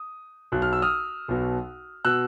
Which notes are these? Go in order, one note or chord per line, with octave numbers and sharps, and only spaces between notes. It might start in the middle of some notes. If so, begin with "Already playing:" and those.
Already playing: D#6
B1 B2 F#6
F6
E6
D#6 F6
B1 B2
B2 E6 F#6